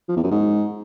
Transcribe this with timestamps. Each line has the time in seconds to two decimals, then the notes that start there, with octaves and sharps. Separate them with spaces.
0.09 F3
0.16 E2
0.24 F#2
0.31 G#2